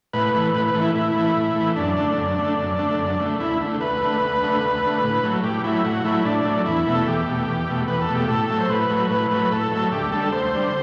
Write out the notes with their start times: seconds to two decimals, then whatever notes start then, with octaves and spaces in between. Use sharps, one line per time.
0.13 A2 B4
0.34 E3 A3
0.55 A2 B4
0.68 B4
0.74 E3 A3
0.81 E4
0.95 A2 E4
1.16 E3 A3
1.36 A2
1.56 E3 A3
1.76 F#2 D4
1.97 D3 A3
2.17 F#2
2.38 D3 A3
2.59 F#2
2.79 D3 A3
2.98 F#2
3.20 D3 A3
3.39 D2 E4
3.60 D3 A3
3.80 D2 B4
4.01 D3 A3
4.21 D2
4.42 D3 A3
4.63 D2
4.83 D3 A3
5.03 A2
5.23 F#3 A3
5.44 A2 G4
5.64 F#3 A3 E4
5.85 A2 F#4
6.04 F#3 A3 E4
6.25 A2 D4
6.45 F#3 A3
6.65 E2 E4
6.86 B2 A3
6.95 A4
7.06 E2 G4
7.27 B2 A3
7.48 E2
7.68 B2 A3
7.88 E2 B4
8.01 A4
8.09 B2 A3
8.15 G4
8.28 A2 A4
8.50 F#3 A3
8.60 C5
8.70 A2 B4
8.90 F#3 A3
9.10 A2 B4
9.31 F#3 A3 B4
9.51 A2 A4
9.71 F#3 A3
9.92 D2 G4
10.12 D3 G3 A4
10.32 D2 C5
10.54 D3 G3